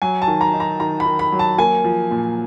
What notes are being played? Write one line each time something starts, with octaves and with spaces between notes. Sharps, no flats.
F#3 G#5
A5
D#3
A#5
D#4
A#5
D#3 A#5
B5
D#3
B5
F#3
A5
A#3 G#5
F3
A#2